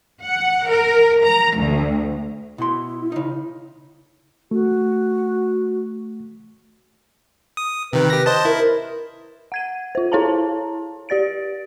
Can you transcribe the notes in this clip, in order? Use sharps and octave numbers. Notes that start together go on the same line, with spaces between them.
F#5
A#4
A#5
D2
B2 E4 C6
C#3 D#4
A3 F#4
D#6
C3 D#3 B4
G4 A#6
C5 D#5 A5
E4 A#4
F#5 G#6 D#7
F4 C5
E4 A4 C#5 F5 A5 A#5
G4 D5 A6 D7